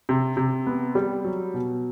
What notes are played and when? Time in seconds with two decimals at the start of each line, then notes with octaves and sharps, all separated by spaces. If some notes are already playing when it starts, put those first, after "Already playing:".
0.09 C3
0.37 C3
0.67 B3
0.95 G3
1.24 F#3
1.54 B2